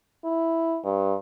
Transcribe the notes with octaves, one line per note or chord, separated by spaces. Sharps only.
E4
G2